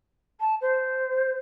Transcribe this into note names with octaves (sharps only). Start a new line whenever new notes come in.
A5
C5